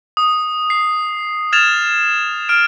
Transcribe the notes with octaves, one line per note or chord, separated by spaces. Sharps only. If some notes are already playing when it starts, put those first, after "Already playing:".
D#6
C7
F6 G#6 A6 E7 F7
F6 D7